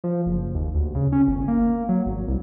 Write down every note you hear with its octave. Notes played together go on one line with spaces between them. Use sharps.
F3
F#1
D#2
D2
C#3
C#4
G1
A#3
F#3
G#1
C2